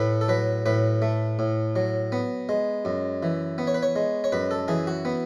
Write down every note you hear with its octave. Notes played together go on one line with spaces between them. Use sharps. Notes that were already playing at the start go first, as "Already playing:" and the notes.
Already playing: A2 A3 B4
A4
F#3 B4
A2 B4
A3
A2
F#3
B3
G#3
F#2
E3
B3
C#5
B4
C#5
G#3
C#5
F#2 B4
A4
E3 G#4
F#4
B3